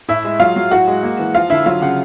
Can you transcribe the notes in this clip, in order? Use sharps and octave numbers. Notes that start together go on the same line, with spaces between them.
A2 E4 E5
G#3
F#3 F4 F5
F#3
A2 F#4 F#5
G#3
A#3
E3
F3 F4 F5
D3 E4 E5
F#3 F4 F5
C#3 F#5